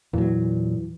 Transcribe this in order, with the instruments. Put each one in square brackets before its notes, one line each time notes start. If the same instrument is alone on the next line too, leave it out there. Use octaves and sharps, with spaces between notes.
[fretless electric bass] E2 F#3 [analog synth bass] A#2 [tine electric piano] E3